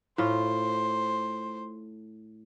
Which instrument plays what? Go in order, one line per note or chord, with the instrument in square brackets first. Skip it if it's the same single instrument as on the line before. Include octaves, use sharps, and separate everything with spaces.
[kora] A2 F4 [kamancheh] C5